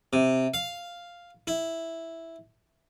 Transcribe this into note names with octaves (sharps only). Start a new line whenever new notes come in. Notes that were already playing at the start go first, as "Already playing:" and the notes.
C3
F5
E4